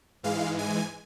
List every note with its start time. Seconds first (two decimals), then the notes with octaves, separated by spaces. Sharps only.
0.23 G#2 E3 G#3 F5
0.59 G#5